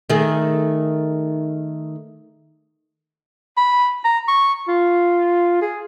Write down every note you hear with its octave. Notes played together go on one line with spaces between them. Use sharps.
D#3 A3 G#4
B5
A#5
C#6
F4
G#4